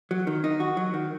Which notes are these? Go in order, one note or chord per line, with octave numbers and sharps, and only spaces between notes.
F#3
D#3
D#4
F#4
F#3
D#3